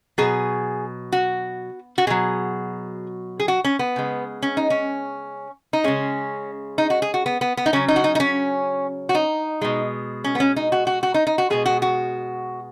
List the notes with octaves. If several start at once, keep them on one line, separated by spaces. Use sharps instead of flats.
B2 F#3 G#4
F#4
F#4
B2 F#3 G#4
G#4
F#4
C#4
B3
C#3 G#3
C#4
D#4
C#4
D#4
C#3 G#3 C#4
D#4
F#4
G#4
F#4
B3
B3
B3
D#4
C#3 F#3 C#4
D#4
F#4
D#4
D#4
C#4
F#4
D#4
B2 G#3
C#4
B3
C#4
D#4
F#4
F#4
F#4
D#4
D#4
F#4
B2 G#3 G#4
F#4
F#4